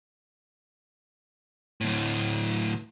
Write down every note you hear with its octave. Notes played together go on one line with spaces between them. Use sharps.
D2 A2